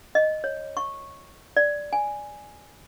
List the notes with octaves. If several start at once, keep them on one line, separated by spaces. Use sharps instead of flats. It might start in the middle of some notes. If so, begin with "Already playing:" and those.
D#5
C#5
C#6
D5
G#5